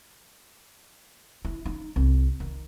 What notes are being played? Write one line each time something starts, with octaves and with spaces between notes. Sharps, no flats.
E4
D#4
C2
D#3